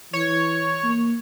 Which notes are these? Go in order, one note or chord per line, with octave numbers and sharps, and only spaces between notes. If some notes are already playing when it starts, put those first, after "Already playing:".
E3 C#5
A#3